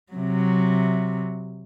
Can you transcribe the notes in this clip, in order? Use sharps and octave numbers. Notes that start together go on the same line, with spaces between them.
C3 F#3